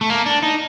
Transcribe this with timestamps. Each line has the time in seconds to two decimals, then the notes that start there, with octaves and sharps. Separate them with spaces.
0.01 A3
0.10 A#3
0.26 D4
0.42 D#4